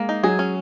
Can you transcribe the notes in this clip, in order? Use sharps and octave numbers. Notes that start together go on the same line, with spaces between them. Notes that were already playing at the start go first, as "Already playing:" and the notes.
Already playing: G#3 A#3
D#4
F#3 G#4
C#4